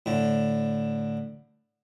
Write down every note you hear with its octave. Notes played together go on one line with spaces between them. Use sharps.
A2 D3